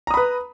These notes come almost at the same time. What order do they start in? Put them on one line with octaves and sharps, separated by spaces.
A#5 D#6 B5 B4